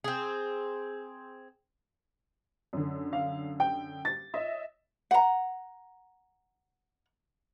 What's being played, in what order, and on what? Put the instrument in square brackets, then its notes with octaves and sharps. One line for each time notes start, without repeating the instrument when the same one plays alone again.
[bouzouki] C4 G#4
[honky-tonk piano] F#2 D3
[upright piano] F5
G5
A6
[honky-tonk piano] C#5 D#5 E5
[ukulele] F#5 A#5